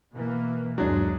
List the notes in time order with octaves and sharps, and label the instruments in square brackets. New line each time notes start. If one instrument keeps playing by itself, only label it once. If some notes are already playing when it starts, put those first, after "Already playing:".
[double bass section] B2 E3 A#3
[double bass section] G1 D#2 G#3 [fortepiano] F#3 D4